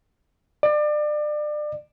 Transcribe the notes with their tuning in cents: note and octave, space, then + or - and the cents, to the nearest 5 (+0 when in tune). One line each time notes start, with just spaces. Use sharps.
D5 +30